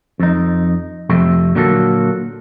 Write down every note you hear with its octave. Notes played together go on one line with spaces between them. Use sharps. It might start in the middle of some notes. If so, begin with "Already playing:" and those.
F2 D#4
F2 C3 A3
A#2 D3 F#3 A#3 F#4 A4